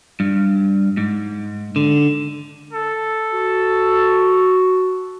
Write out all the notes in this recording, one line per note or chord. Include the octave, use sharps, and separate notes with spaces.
G2
G#2
D3
A4
F#4